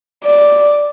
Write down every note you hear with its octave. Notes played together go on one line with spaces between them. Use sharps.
D5